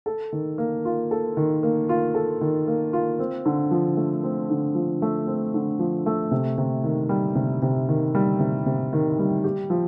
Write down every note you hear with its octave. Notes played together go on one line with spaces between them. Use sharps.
A4
D#3
A#3
F4
A4
D#3
A#3
F4
A4
D#3
A#3
F4
C4
D3
F3
A3
C4
D3
F3
A3
C4
D3
F3
A3
C3
C3
D#3
G3
C3
C3
D#3
G3
C3
C3
D#3
G3
G4
F3